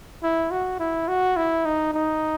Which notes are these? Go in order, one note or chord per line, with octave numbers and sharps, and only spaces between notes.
E4
F#4
E4
F#4
E4
D#4
D#4